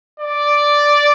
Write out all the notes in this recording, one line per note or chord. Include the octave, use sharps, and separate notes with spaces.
D5